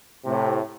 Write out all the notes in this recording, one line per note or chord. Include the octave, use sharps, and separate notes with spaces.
A2 C3